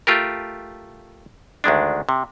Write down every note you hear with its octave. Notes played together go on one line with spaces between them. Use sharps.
A3 F4 G4 A#4
D2 D#3 G#3 D4
C3